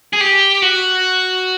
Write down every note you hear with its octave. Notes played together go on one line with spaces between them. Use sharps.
G#4
G4
F#4